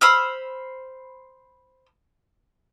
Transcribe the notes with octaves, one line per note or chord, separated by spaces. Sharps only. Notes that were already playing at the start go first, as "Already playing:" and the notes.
C5 B5 E6 F6